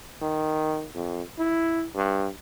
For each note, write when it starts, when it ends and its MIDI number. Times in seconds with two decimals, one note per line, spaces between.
0.22 0.86 51
0.95 1.22 41
1.39 1.84 64
1.95 2.28 43